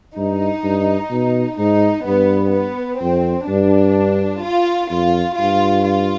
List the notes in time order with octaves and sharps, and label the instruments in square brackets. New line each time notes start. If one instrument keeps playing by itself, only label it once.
[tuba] G2 [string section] D#4
[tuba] G2
B2
[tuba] G#2 [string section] D#4
[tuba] G2 [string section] B3
[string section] B3
[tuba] F2 [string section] C4
[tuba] G2 [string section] D4
[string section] F4
[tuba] F2 [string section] F4
[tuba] G2 [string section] F4
[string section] F4